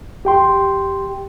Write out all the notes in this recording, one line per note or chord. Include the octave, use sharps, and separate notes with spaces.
E2 G4 G5 C6